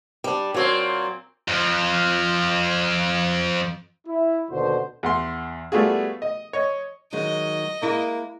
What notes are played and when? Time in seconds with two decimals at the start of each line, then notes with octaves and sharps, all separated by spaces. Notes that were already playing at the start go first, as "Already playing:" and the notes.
0.24 G3 D4
0.54 A#2 F#3 A#3 C4 C#5
1.48 F2 F3
4.07 E4
4.51 D#2 B2 D3 F#4 C5
5.03 E2 F#5 C6
5.72 G3 A3 B3 F4 F#4 G#4
6.22 D#5
6.53 C#5 D#5
7.12 D#3 F#3 G#3 D#5
7.82 G#3 A#3 E4